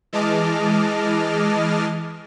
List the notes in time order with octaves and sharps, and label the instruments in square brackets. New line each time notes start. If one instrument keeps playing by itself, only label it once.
[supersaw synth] E3 G#3 D#5 A5 D6 F6